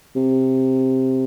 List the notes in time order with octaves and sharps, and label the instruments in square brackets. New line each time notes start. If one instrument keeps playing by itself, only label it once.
[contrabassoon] C3